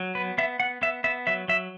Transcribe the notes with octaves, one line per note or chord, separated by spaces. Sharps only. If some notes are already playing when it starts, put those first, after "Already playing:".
Already playing: F#3
B3 B4
B3 E5
B3 F#5
B3 E5
B3 E5
F#3 E5
F#3 E5